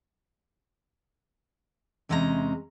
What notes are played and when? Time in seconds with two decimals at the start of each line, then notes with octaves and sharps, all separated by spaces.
2.09 E2 C3 G#3 C#4 G4 A#5